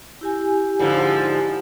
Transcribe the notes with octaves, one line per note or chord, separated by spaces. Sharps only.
E4 G4 G#5
G#2 D3 F3